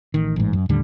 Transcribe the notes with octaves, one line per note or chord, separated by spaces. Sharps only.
A1 D#3
A1 G#2
F#2
D#2 A2 D3 G3